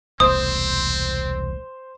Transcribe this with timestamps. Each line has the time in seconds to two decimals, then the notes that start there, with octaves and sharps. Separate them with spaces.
0.20 E1 C2 A3 C4 C5 D#6